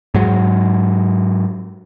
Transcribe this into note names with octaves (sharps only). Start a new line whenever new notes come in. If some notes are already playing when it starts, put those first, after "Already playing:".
G#2 F#3